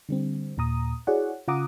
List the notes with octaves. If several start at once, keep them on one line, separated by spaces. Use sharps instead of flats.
D3 G3 C4
D#2 A#2 A#5 D#6
E4 F#4 G#4 C#5 D5 F#5
C#3 F4 F#5 A#5 D6 D#6